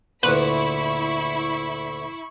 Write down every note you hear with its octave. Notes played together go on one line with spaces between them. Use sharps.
D2 A#2 E4 B4 B5 C#6